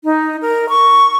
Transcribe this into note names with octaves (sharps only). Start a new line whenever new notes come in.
D#4
A#4
C#6